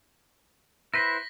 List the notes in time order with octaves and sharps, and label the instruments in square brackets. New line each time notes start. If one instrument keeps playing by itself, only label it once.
[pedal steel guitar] E4 B4 C5 [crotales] A#6 B6